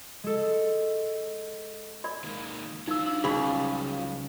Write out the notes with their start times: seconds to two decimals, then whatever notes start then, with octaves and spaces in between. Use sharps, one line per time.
0.24 G#3 A4
2.04 D5 B5
2.24 D#3 G#3 A#3
2.88 F#3 D#4 F4 E6
3.06 D4
3.24 C#2 G3 C#4 G#4 D5 F5 B5